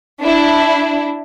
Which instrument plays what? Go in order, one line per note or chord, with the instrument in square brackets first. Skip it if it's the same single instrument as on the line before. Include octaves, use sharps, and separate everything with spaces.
[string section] D4 E4